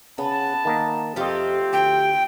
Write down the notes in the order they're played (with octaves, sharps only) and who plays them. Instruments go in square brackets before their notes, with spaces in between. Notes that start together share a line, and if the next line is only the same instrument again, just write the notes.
[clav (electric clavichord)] C#3 [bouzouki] B3 [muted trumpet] A5
[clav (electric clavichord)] D#3 A#3 D#5
[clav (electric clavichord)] F2 D#5 [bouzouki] A3 F4 G4 [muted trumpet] C4
[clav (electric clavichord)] D2 [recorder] G5